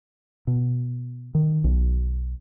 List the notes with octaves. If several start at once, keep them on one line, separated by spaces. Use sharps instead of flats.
B2
D#3
B1